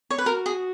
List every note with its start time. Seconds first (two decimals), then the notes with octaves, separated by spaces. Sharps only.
0.11 C#5
0.18 B4
0.26 F#4 A#4
0.46 G#4